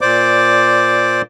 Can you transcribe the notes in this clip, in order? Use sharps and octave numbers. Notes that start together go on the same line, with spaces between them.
A#2 C5 D5 D6